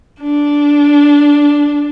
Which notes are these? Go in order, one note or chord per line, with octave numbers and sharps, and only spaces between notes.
D4